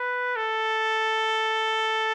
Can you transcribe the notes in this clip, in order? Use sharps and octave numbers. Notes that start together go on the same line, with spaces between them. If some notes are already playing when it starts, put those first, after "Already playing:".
Already playing: B4
A4